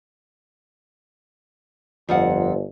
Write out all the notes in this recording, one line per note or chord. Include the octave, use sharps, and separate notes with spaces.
G1 F2 F3 F#5